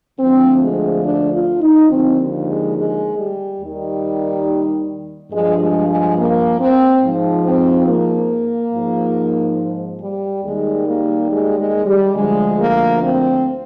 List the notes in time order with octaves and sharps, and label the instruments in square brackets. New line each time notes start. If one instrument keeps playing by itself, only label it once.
[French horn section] D2 D3 F3 C4
G#3
D4
F4
D#4
D#2 D3 F3 C4
G#3
G#3
G3
D#2 D#3 G3
G2 F3 G#3
G#3
G#3
A#3
C4
G#2 F3
C4
A#3
G#2 F3
G3
D#2 D#3 G3 G#3
A#3
G#3
G#3
G3
D2 D3 F3 G#3
A#3
C4